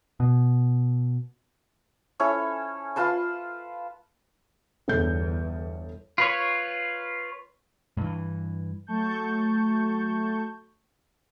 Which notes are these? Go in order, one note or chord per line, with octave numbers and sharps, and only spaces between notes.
B2
C#4 E4 A4 C#5
F4 B4 A5 C6
G1 E2 A4 G6
F4 B4 C#5
G2 E3
F#3 A3 A5 C#6 G6